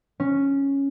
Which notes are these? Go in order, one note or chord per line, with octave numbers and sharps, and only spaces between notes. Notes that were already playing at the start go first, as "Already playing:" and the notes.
C#4